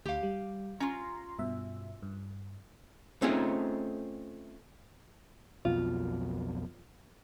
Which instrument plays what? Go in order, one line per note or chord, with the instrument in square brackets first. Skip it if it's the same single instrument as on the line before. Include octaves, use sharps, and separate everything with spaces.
[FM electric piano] D2 [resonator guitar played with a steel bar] G4 F5
[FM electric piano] G3
[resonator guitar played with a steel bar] C#4 F4 [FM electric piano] A#5 C6
[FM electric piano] G2 B2 E5
G2
[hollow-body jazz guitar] A3 C4 C#4 D#4 F4 G#4
[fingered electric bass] B1 F2 B2 [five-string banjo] F4